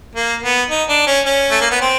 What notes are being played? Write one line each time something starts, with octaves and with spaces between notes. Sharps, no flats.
A#3
B3
D#4
D4
C#4
C#4
A3
A#3
B3
C4